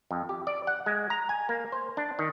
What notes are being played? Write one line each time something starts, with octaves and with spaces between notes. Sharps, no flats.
F2
G4
D5
F#5
G#3
A#5
G#5
A#3
C5
D4
D#3